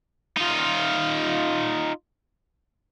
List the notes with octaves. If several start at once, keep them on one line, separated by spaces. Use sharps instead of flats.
D#4 F4